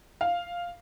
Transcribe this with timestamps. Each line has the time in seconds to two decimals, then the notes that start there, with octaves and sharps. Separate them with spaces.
0.21 F5